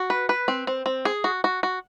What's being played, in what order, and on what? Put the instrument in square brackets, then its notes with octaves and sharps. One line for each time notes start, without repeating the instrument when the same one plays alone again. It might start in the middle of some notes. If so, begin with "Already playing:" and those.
Already playing: [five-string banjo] F#4
B4
B4
C4
C4
C4
G#4
F#4
F#4
F#4